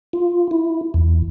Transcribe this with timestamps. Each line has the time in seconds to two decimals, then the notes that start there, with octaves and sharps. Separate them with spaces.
0.13 F4
0.51 E4
0.94 E2